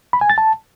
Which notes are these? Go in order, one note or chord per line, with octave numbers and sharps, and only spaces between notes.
B5
G#5
A6
A5